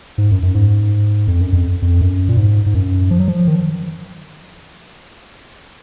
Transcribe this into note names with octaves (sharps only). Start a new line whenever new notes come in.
G#2
F#2
F#2
G#2
F2
F#2
F2
F2
F#2
A#2
G#2
G#2
F#2
F3
F#3
F3
D#3